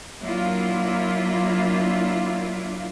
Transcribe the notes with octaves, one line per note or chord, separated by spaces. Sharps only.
F#3 A#3 D4 E4 F4